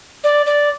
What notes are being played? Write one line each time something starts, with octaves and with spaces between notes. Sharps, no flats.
D5
D5